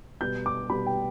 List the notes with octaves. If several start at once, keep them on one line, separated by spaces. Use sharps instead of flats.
B2 G3 B3 G6
D6
B2 G3 B3 B5
G5